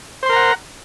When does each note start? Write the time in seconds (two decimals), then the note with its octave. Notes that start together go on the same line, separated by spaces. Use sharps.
0.23 C5
0.26 C6
0.29 A#4
0.33 A#5
0.36 F#5